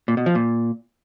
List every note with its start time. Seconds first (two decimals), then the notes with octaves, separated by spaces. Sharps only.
0.08 A#2
0.17 B2
0.26 F3
0.35 A#2